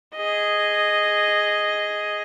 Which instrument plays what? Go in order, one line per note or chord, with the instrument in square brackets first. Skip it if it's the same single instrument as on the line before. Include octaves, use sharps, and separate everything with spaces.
[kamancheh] G#4 D#5